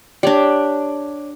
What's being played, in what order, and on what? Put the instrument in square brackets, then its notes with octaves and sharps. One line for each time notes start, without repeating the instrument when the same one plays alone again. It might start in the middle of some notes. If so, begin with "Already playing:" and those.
[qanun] D4 G4 [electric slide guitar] C#5 D5